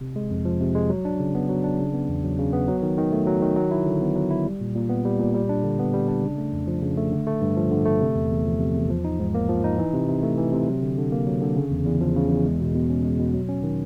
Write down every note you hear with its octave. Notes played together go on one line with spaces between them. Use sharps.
C3
G#3
F2
F3
C3
G#3
F#3
D4
C#3
B3
F#3
D4
C#3
B3
E2
F#3
C#3
B3
F#3
D#3
D#3
A3
F#3
D#3
F#3
E4
D3
B3
F#3
E4
G3
A#2
A#2
B3
G3
A#2
G3
D4
D3
B3
G3
D4
C#3
A3
F2
F3
C#3
A3
D3
A3
G2
F3
D3
A3
C3
E2
E2
F3
C3
E2
F3
D#4
G#2
A#3
F3
D#4
E3
C3
C3
A3
E3
C3
F#3
D3
D3
A#3
F#3
D3
C#3
E2
E2
F3
C#3
E2
G#3
B2
B2
C#4
G#3
B2
F#3
C#4
D#3